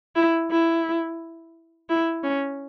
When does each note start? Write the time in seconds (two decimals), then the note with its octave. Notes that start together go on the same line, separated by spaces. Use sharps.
0.16 E4
0.51 E4
1.89 E4
2.23 C#4